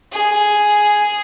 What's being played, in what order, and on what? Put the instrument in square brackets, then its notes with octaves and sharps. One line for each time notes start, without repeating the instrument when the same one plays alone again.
[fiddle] G#4